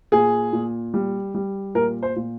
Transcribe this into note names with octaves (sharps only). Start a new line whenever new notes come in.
A#2 G#4
A#2
G3
G3
A#2 A#4
C5
A#2